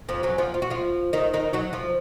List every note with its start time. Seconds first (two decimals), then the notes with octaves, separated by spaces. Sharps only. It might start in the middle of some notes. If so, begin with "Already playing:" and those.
0.09 F2 F3
0.23 F#2 F#3
0.38 F3 F4
0.54 F4
0.62 F#4
0.70 F3 F4
1.13 D#3 D#4
1.33 D#3 D#4
1.53 F#3 F#4
1.73 F3 F4